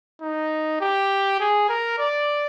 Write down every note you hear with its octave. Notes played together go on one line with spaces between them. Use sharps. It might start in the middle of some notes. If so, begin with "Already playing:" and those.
D#4
G4
G#4
A#4
D5